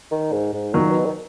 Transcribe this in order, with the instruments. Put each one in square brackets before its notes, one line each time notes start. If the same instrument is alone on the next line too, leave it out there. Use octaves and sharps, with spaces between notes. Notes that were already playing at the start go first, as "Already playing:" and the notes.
[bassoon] D#3
G#2
G#2
[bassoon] A#2 [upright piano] D#3 F#3
[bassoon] B2
D#3